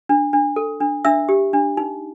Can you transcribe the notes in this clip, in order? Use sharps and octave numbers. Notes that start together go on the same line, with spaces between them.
D4
D4
A4
D4
D4 E5 E6
G4
D4
D#4